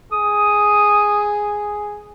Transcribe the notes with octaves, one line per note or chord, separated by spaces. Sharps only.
G#4 D#6